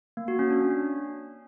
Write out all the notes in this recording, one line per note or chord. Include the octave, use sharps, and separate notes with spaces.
A#3
F#4
C#4
D4
C#4